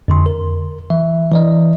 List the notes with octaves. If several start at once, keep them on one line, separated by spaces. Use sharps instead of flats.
F2 D3 C6
A#4
E3 E5
E3 D5 D#5